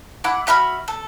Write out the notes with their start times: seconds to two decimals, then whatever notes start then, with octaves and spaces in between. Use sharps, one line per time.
0.24 E4 F#5 D6
0.47 F#4 E5 B5 F6
0.88 A4